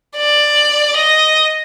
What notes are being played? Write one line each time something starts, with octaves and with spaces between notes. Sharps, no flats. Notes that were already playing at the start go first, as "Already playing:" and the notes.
D5
D#5